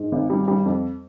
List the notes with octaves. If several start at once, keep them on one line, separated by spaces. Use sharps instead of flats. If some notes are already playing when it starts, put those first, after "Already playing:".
Already playing: G#2
G#1
G3
G3
F2